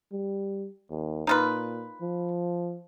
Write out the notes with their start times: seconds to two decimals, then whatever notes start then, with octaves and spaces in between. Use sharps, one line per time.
0.12 G3
0.90 D#2
1.27 A#2 D#4 F4 B4
2.01 F3